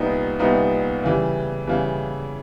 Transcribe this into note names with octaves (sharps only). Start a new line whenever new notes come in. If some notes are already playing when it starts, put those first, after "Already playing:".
Already playing: C2 A#2 G3 B3 D#4
C2 A#2 G3 B3 D#4
C#3 E3 G3
C#3 E3 G3